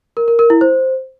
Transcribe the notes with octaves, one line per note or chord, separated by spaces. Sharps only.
A#4
A#4
A#4
E4
C5